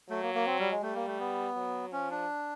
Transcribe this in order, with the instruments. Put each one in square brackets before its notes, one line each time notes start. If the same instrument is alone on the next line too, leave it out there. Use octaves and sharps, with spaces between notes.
[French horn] F#3 [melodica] A3
[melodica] A#3
A#3
C4
G3
G#3
[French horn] G3 [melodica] A3
[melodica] A#3
A3
B3
[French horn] F#3
[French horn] F3 [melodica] C#4
[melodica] D4